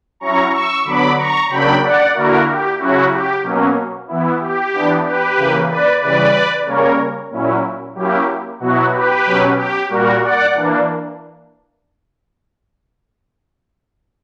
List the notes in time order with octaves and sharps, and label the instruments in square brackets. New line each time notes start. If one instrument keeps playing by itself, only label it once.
[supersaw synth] F#3 C#4 E4 A#5 C#6
C#6 E6
D3 F#3 B3 B5 D6
A#5 C#6
C#3 F#3 A#3 D4 G5 B5
D5 F#5
D3 A#3 E4 F#4 A#4
G4
C#3 F#3 C#4 E4 F#4
G4
B2 F#3 A#3 C#4
E3 B3 E4
G4
E3 B3 D4
G4 B4
C#3 E3 A#3
B4 D5
C#3 E3 G3 B4 D5
C#3 G3 A#3 C#4 A#4 C#5
A#2 F#3 C#4 E4
F#3 A#3 C#4 E4 G4
B2 F#3 B3 E4 F#4
G4 B4
B2 F#3 C#4
G4
A#2 G3 A#3 F#4 A#4
D5 F#5
E3 A#3 D4